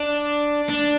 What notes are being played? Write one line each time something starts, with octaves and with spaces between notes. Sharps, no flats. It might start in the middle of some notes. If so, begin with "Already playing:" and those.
Already playing: D4
D4